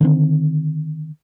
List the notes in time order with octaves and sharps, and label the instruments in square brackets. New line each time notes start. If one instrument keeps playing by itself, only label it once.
[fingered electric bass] D3 D#3 C4